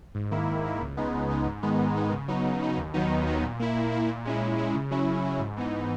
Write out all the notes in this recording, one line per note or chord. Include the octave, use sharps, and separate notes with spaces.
G#2
D#3 A#3 E4
G#2
D#3 A#3 E4
C#2
C#3 G#3 B3 D#4
C#2
C#3 G#3 B3 D#4
G#2
D#3 G#3 B3 D#4
G#2
D#3 G#3 B3 D#4
C#3
F#3 B3 D#4
C#3
F#3 B3 D#4
D#2
D#3 F#3 B3 D#4
D#2
D#3 F#3 B3 D#4
A#2
A#3 E4
A#2
A#3 E4
A#2
G#3 C#4 E4
A#2
G#3 C#4 E4
C#3
F#3 C#4 E4
C#3
F#3 C#4 E4
G#2
E3 B3 D#4